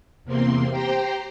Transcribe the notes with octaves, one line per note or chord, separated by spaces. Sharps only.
E2 C3 A#3 C4 C6
G4 C5 G5 A#5 C6